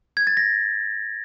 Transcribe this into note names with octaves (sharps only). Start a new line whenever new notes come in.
G#6
A6
A#6